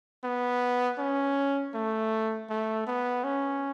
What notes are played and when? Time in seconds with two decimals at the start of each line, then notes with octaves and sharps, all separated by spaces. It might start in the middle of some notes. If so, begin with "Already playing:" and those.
0.24 B3
0.98 C#4
1.74 A3
2.49 A3
2.87 B3
3.24 C#4